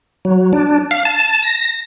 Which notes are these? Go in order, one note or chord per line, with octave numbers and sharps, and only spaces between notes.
F#3
D4
F5
A5
A#6